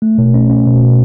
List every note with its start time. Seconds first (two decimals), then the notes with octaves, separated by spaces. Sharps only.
0.02 A3
0.18 B2
0.34 C#4
0.50 C#4
0.66 B2
0.83 B2